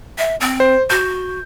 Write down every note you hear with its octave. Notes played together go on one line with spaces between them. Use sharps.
E5
C4
C5
F#4 G6